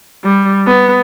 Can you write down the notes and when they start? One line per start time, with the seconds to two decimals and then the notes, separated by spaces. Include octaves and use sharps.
0.24 G3
0.66 B3